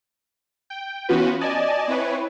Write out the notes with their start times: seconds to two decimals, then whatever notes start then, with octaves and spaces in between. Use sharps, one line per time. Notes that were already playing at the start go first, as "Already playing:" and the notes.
0.70 G5
1.09 E3 B3 C#4 F4 F#4 B4
1.41 D5 D#5 G#5 A5
1.88 C4 E4 B4 C#5